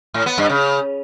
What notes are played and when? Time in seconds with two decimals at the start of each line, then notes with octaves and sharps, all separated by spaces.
0.14 A2
0.26 B3
0.38 G2
0.50 C#3